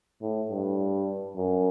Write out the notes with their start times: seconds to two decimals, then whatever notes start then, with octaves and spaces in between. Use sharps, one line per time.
0.22 A2
0.50 G2
1.36 F#2